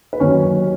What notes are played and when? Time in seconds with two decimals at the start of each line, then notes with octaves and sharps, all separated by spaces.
0.13 B4
0.20 D#2 D#3 F#3 C#4 C#5